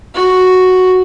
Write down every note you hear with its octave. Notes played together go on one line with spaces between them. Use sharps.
F#4